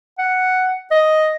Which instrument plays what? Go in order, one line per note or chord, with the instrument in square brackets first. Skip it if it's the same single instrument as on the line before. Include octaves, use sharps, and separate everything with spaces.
[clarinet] F#5
D#5